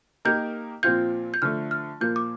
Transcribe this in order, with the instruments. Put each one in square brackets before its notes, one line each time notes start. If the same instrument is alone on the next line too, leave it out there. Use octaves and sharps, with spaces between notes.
[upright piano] A#3 D#4 G4 A#4 [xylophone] G6
[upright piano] A#2 F3 C4 F4 [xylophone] G6
[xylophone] G6
[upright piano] D3 F3 A3 [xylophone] F6
[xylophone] F6
[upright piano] A#2 F3 A#3 F4 [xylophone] G6
[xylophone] D6